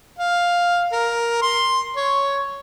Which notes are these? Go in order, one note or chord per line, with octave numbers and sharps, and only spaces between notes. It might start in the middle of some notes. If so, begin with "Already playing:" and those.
F5
A#4
C6
C#5